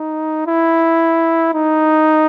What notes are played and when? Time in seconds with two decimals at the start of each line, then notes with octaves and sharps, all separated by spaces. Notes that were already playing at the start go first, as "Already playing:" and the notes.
Already playing: D#4
0.47 E4
1.54 D#4